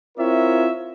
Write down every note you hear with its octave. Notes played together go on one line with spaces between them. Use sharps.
C4 E4 F4 A#4 C#5 E5